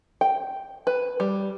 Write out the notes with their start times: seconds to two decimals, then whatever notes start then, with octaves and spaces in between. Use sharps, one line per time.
0.21 G5
0.87 B4
1.20 G3